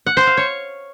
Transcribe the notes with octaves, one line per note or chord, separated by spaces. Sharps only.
F#5
C5
F5
C#5